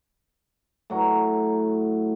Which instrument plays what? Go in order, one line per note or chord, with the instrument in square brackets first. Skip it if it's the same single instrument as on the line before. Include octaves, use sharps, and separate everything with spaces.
[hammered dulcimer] A2 F#3 A#5